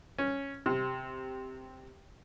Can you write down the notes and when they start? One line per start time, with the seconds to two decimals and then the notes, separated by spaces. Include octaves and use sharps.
0.18 C#4
0.66 C3